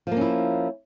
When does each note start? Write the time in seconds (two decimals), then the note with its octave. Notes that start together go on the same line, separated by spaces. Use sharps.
0.07 F3
0.12 A#3
0.16 C#4
0.21 E4